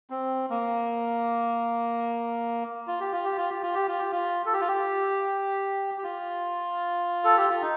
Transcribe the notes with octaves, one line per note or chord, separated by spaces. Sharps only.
C4
A#3
F4
G4
F4
G4
F4
G4
F4
G4
F4
G4
F4
A4
G4
F4
G4
G4
F4
A4
G4
F4
D#4